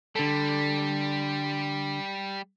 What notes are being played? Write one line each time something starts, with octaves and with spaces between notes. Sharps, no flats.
D3 G3 A4